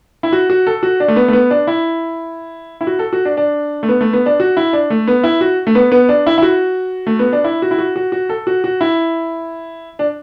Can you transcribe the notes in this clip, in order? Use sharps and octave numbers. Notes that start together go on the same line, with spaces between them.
E4
F#4
F#4
A4
F#4
D4
A3
B3
A3
B3
D4
E4
E4
F#4
A4
F#4
D4
D4
A3
B3
A3
B3
D4
F#4
E4
D4
A3
B3
E4
F#4
A3
B3
B3
D4
E4
E4
F#4
A3
B3
D4
E4
F#4
E4
F#4
F#4
F#4
A4
F#4
F#4
E4
D4